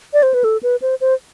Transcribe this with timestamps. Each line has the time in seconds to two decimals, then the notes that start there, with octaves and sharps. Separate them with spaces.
0.14 D5
0.23 C5
0.34 B4
0.44 A4
0.63 B4
0.82 C5
1.01 C5